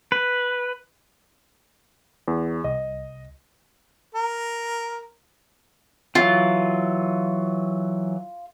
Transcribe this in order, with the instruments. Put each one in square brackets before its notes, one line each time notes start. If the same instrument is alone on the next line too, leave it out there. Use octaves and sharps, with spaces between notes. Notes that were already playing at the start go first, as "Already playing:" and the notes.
[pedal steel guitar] B4
[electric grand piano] E2
[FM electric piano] C2 [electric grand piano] D#5
[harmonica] A#4
[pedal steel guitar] E3 F#3 [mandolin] F4